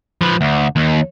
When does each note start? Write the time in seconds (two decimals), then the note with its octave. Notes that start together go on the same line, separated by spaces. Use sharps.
0.21 F3 B4
0.41 D2
0.76 D#2